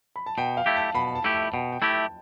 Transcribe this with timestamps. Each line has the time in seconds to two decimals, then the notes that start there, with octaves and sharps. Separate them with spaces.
0.16 B5
0.26 A5
0.38 B2 G5
0.57 F5
0.66 A3 E4 G4
0.76 A5
0.95 B2 B5
1.15 A5
1.24 A3 E4 G4
1.34 A5
1.53 B2 G5
1.72 G5
1.82 A3 E4 G4
1.91 A5